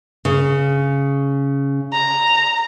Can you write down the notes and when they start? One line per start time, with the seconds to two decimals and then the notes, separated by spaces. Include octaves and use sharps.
0.25 C#3
1.93 A#5